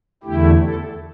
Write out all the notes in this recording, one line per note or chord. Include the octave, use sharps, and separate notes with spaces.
E2 D3 A3 E4 G4
A4